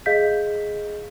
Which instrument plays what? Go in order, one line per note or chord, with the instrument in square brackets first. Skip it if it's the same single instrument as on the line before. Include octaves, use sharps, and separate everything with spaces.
[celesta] G#4 D#5 F5 G6 B6